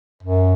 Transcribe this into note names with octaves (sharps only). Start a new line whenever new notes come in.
F#2